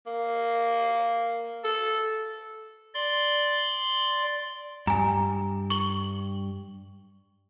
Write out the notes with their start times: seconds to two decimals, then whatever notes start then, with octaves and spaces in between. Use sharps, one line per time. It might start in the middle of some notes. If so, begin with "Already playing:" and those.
0.07 A#3
1.64 A4
2.94 D5 C6
4.87 G2 G#5 A#5
5.70 C#6 F#7 G7